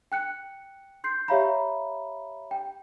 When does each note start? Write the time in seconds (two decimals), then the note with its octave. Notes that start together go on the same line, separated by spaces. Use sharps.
0.12 G5 F#6 C#7
1.04 C6 G6 C7
1.28 G4 C#5 E5 F5 A#5 B5
2.51 G5